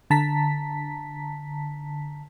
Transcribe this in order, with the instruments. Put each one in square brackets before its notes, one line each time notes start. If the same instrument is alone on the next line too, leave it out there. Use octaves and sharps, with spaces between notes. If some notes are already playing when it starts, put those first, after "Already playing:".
[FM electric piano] D3 A5 A#5 B6